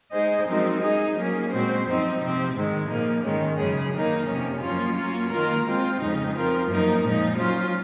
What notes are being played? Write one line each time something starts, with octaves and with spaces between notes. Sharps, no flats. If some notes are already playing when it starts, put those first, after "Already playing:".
G#3 D#4 G#4 C5 D#5
F#2 F3 G#3 C4 D#4
G#3 D#4 G#4 D#5
F#3 A#3 C#4 G#4
A#2 G#3 C4 F#4 C5
F#2 F3 C4 D#4
C3 F3 C4
G#2 D#3 G#3
A#2 F3 A#3 D#4
G#2 D#3 G#3 C#4
F#2 C#3 G#3 C#4 G#4
D#3 A#3 D#4
F2 C3 F3 A#3 C#4
F#2 F3 A#3 C#4 F4
F#3 A#3 C#4 F4
D#3 A#3 F4 A#4
G#3 C4 F4
F2 C#3 G#3 D#4
F3 C4 F4 A#4
F#2 F3 A#3 D#4 A#4
A#2 F3 G#3 D#4
F#3 C#4 F4 C5